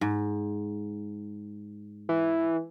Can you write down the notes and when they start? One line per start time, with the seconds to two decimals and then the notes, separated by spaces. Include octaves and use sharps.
0.01 G#2
2.09 E3